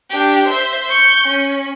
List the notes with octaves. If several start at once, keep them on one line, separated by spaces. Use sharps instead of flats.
D4 G4
C5 E5
C#6 G6
C#4